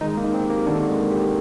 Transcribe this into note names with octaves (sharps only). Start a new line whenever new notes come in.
D#3 G#3 D#4
A#3
D#4
C4
G4
A#3
D3 D#3 D4
G#3
G4